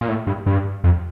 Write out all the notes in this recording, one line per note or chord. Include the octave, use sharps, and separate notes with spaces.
A#2
A2
G2
G2
F2